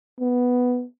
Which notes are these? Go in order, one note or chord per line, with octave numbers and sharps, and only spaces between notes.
B3